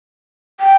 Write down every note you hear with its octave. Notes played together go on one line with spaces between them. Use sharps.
G5